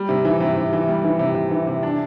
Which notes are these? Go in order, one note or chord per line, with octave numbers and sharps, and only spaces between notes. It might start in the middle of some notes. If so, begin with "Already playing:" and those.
Already playing: G3
C3
E3
C3
C3
E3
G3
E3
C3
C3
E3
C3
D4